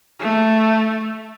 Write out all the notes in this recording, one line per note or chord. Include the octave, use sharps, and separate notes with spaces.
A3